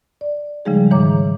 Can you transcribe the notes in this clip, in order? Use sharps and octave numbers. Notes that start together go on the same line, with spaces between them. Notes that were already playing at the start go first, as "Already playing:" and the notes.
D5
C#3 F3 G3 G#3 D#4 G#4
G#2 D#3 E3 C#5 A#5 D6